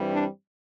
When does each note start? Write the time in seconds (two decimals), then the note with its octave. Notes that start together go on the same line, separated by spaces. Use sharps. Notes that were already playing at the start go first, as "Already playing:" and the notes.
Already playing: G2 E3 G3 C4
0.13 D4